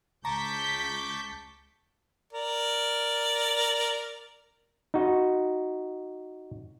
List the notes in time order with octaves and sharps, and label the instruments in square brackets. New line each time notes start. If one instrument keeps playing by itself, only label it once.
[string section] C#2 G6 B6 [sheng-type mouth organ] A5 C#6 D6 [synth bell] A#5
[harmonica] A#4 D5
[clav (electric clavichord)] D#4 F#4